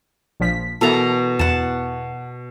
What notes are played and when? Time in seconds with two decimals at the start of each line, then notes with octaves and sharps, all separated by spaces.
0.40 A#1 F3 B6
0.81 B2 E3 A4 A#4 A#5
1.39 E2 F#5 A5